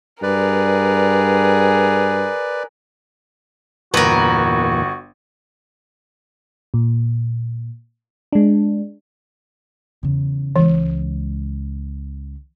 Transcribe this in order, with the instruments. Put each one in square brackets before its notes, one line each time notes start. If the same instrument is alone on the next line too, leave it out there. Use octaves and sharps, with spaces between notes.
[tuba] G2 [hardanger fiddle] G#4 A#4 [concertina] B4 D5
[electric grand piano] G1 [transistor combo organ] E2 A#2 [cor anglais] F#4 [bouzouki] A#4 B4
[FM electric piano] A#2
G#3 D4
[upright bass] E2 C#3
[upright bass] C#2 G#3 [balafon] E3